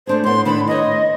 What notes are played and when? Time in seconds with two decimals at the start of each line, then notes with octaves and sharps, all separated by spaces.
0.07 A3 D4 G#4 C5
0.24 A2 B3 C6
0.45 A2 D#3 D4 B5
0.68 B3 C#5 D#5